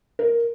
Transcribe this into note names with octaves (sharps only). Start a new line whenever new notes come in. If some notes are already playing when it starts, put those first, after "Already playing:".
A#4